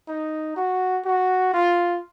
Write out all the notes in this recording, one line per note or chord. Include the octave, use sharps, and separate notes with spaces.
D#4
F#4
F#4
F4